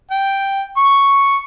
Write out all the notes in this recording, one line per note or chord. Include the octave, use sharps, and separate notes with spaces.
G5
C#6